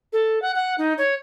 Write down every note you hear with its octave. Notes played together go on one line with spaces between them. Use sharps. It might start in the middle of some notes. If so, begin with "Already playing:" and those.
A4
F#5
F#5
D#4
C#5